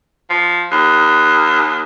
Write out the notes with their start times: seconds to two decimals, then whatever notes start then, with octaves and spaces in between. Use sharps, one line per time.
0.30 F3
0.71 D#2